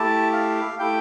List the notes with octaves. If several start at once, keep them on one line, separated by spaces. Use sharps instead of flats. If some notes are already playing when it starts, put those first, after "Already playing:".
Already playing: A3 E4 G4 A5
F5
A3 E4 G4 G5